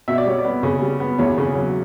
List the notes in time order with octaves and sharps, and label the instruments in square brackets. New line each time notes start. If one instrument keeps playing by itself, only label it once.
[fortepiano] B2 E5
D5
G3 C#5
D5
B3
C#3
G3
B3
E2 C#5
C#3
F#3